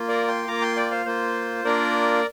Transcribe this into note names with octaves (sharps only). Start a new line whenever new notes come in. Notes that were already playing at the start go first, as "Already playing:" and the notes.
Already playing: A#3 F4
A#4 D5
G5 C6
A#3 F4 A#5 D6
G5 C6
D5 G5
C5 F5
A#3 F4 C5
A#3 D4 F4 A#4 D5